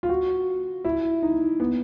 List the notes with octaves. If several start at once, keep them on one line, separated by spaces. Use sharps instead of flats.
F4
F#4
E4
D#4
B3